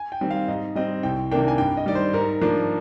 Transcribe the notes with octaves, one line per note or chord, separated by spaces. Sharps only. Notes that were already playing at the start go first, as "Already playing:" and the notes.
Already playing: G#5
G5
D#3 G3 C4
F5
G#2 D#5
G3 C4 D#5
C2 G5
C3 D#3 A#3 D4 G5
G#5
G2 G5
D#5
D#3 G3 D5
C5
G#2 A#4
F3 A#3 D4